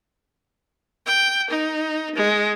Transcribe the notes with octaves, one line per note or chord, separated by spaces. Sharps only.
G5
D#4
G#3